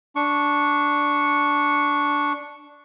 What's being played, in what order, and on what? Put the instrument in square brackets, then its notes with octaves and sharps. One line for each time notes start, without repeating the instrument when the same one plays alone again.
[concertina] D4 C#6